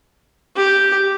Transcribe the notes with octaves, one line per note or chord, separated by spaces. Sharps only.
G4